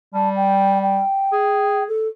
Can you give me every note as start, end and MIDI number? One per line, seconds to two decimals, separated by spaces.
0.14 1.01 55
0.14 0.29 81
0.36 0.81 79
0.81 1.83 79
1.32 1.88 68
1.88 2.07 69